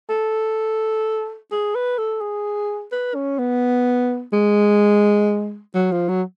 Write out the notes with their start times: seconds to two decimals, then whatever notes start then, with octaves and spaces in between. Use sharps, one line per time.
0.10 A4
1.52 G#4
1.75 B4
1.98 A4
2.21 G#4
2.92 B4
3.15 C#4
3.39 B3
4.33 G#3
5.74 F#3
5.92 F3
6.09 F#3